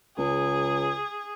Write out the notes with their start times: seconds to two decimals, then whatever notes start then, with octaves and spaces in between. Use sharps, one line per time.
0.18 C#2 G#4